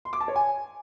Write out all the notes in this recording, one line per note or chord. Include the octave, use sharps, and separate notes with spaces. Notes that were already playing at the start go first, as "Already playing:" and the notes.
C6
D6
A5
C#5
G#5